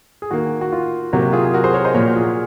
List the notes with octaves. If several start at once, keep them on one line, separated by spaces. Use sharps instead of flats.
G#4
D#3 A#3 F#4
F#4
F4
C3 F#3 A#3 F#4
F4 G#4
G#4
F#4 A#4
G#4 C5
A#4 C#5
C5 D#5
A#2 F3 A#3 A#4 C#5
F#4
F4 G#4